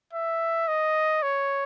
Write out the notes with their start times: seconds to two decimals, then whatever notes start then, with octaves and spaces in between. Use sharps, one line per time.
0.13 E5
0.68 D#5
1.23 C#5